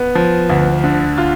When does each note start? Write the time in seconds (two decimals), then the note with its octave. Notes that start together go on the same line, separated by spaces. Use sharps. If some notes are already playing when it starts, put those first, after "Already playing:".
Already playing: B3
0.15 F3
0.50 D2
0.84 D3
1.18 F4